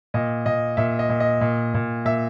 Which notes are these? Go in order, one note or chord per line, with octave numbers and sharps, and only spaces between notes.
A#2 D#5
A#2 D#5
A#2 E5
D#5
A#2
D#5
A#2
A#2
A#2 E5